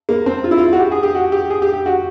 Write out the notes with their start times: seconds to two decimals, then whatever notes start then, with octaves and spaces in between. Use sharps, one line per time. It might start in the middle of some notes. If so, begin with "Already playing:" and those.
0.09 A#3
0.26 C4
0.44 F4
0.51 E4
0.58 F4
0.73 F#4
0.80 G4
0.91 G#4
1.03 G4
1.15 F#4
1.32 G4
1.50 G#4
1.62 G4
1.73 G4
1.86 F#4